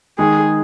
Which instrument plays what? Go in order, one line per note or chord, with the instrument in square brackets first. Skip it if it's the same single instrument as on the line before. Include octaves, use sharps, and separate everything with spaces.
[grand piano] D#3 G#3 D#4 [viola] G#4